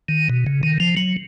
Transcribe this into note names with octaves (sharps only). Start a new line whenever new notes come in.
D#3
B2
C#3
D#3
F3
F#3